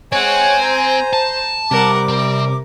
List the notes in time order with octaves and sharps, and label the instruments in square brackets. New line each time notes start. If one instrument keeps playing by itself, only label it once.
[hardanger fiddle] G#3 F#5 [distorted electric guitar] C4 [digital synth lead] C#5 [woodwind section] G#5
[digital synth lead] C5 [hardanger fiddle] A#5
[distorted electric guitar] A5
[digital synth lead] C3 [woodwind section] G3 D6 [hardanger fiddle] A#4 F#5
[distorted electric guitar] C4 [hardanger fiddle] A#4